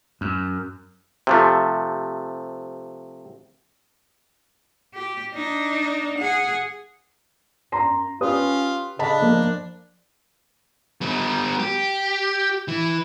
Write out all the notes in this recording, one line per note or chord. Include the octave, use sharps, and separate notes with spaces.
F#2
C3 F3 A3
G4
D4 D#4
G#4 F#5
F#2 A#5 C6
C#4 F4 G4 B4 D#6
C#3 D4 D#5 A5 B5
F3 A#3
G3 B3
G4
E3